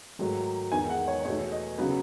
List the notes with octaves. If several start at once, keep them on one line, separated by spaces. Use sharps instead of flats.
G#2 D#3 F#3 A3
E2 D#3 G#3 B3 G#5
F#5
C#5
E2 B2 A3 C#5
D#5
C#3 F#3 B3